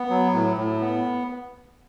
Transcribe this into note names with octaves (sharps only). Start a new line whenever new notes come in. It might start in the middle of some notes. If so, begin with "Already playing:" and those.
Already playing: B3
F#3
A2
A2
B3